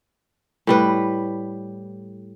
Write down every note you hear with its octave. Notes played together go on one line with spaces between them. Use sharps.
A2 G3 B4